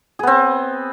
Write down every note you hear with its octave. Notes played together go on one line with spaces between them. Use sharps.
B3 C4 G#4